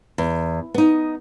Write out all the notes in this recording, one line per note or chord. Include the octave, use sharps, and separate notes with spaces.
E2
B3 D#4